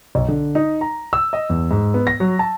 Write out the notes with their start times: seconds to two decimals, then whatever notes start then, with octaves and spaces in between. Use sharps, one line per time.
0.15 B1
0.28 D3
0.55 D#4
0.81 A#5
1.13 E6
1.33 D#5
1.50 E2
1.71 G#2
1.94 B3
2.07 A#6
2.20 F#3
2.39 A5